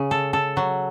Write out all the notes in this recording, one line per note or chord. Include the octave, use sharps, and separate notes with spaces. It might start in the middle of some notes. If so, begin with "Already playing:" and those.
Already playing: C#3
A4
A4
F#3